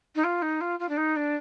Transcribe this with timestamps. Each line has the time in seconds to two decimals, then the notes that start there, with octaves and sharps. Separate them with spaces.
0.15 D#4
0.24 F4
0.42 D#4
0.60 F4
0.79 F4
0.89 D4
0.97 D#4
1.16 D4